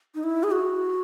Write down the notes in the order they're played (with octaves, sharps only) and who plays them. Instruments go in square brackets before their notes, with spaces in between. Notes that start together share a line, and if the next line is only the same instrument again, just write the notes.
[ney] D#4
E4
G#4
F#4